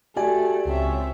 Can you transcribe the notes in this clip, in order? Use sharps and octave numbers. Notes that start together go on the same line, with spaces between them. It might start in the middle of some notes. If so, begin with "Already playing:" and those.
A3 F#4 G4 D5 G#5
C#2 C4 F4 C#5 E5